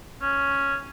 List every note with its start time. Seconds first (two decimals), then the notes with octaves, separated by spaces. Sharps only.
0.22 C#4